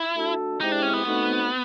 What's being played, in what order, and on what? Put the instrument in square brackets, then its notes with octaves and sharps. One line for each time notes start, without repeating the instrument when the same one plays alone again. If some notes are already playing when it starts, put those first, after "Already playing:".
Already playing: [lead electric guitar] E4
[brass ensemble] A3 D4 F#4 A4
[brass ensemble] G#3 C4 E4 G4 [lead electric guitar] D#4
[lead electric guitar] D4
C#4
B3
[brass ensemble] A3 C4 D#4 F#4